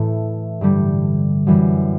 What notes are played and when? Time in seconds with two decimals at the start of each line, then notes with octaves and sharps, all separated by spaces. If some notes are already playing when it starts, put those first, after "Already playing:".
Already playing: A2 E3 A3
0.61 G2 D3 G3
1.47 F#2 E3 G3